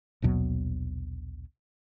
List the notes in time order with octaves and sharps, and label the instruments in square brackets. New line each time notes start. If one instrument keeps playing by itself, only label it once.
[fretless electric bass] A#1 D#2 B2 F#3